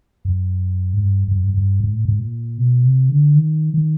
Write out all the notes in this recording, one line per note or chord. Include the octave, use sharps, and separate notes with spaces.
F#2
G#2
G2
G2
F#2
G2
G2
G#2
A2
G#2
A#2
B2
C3
D3
D#3
D#3